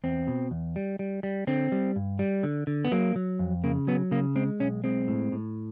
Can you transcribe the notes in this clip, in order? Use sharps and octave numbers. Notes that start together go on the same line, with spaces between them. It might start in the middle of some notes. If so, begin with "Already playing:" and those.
E2 C4
B2
E2
G3
G3
G3
D3 C4
G3
G2
G3
D3
D3
B3
F#3 A#3
F#3
F2
C#3 A#3
F#3 B3
C#3 A#3
G#3 C4
B1 C#4
G#3 C4
A2
A2